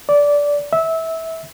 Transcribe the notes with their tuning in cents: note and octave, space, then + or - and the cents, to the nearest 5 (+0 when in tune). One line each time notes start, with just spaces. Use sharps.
D5 -15
E5 -20